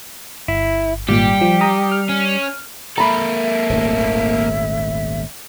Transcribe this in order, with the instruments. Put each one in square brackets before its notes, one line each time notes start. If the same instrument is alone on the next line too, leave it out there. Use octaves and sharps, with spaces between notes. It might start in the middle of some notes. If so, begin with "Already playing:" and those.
[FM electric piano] G1 [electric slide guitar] E4
[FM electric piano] G#1 A#2 [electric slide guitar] G3 [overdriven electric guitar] G4
[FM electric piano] F3
A#5 D#6
F6
[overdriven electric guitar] C#4
[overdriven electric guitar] A#3 A4 [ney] E5 [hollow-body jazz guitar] A#5 B5
[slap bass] D#1 G#1 A3